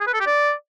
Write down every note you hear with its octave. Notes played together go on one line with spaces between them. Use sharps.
G#4
B4
A4
G4
D5